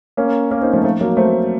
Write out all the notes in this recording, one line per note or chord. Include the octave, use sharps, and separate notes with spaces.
A#3 C#4
A#3 C#4
C4 D#4
F3 A3
F3 A3
F#3 A#3
A3 C4